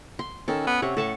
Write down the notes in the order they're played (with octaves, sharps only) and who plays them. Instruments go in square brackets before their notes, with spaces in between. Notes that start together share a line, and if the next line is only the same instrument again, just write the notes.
[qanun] C6
[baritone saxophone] D#3 [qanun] C#4 A4
[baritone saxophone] B3
[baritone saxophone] C3 [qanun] C#5 F#5
[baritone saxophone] A2 [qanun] A4 A5 C#6